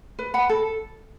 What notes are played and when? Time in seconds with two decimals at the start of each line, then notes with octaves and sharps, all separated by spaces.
0.19 B4
0.34 F#5 B5
0.49 A4